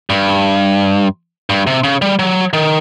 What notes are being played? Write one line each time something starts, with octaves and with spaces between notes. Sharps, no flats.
G2
G2
C3
C#3
G3
F#3
D#3